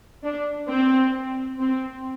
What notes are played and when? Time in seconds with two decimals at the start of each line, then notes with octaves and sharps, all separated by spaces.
0.23 D4
0.69 C4
1.59 C4